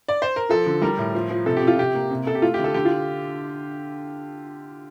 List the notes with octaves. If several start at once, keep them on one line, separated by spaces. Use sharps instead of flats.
D5
C5
A#4
F3 A4
D3
G3 A#4
A2
F3
F3
C3 A4
G4
C3
F4
C3 G4
A#3
C3
C3 A4
G4
A3 F4
G4
D3 A4
D3 G4
F4